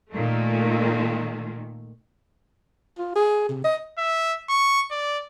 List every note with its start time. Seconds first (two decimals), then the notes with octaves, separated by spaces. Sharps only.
0.13 A#2 D#3 A3
2.98 F4
3.15 G#4
3.49 C3
3.64 D#5
3.98 E5
4.49 C#6
4.91 D5